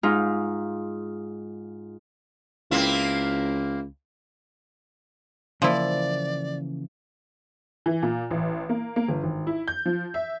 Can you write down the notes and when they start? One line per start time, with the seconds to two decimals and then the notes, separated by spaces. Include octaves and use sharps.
0.03 G#2 D#4 F4
2.71 C#2 A#3 C4 E4
5.62 C#3 E3 F3 A#3 E4 D5
7.86 E3
8.02 A#2
8.31 A1
8.69 A#3
8.96 A#3
9.08 G1
9.23 G#1
9.47 E4
9.68 G6
9.85 F3
10.14 E5